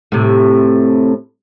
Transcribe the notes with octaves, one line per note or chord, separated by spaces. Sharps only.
A2 C3